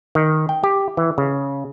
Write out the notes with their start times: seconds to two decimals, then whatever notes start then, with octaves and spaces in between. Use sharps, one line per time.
0.15 D#3
0.49 G5
0.64 G4
0.97 E3
1.18 C#3